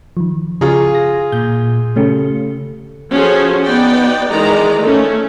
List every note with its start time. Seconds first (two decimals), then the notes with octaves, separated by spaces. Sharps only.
0.17 D#3 F3
0.61 C#3 F4 G#4 A#5 C#6
0.95 A#6
1.32 A#2 G6
1.96 C#3 A3 C#4 G4 A4
3.11 F3 C#4 F#4 G#4 A4 C5
3.63 B3 D#4 F#4 D5 G5
4.30 D#3 E3 G#3 D5 D#5 A#5
4.82 A3 C#4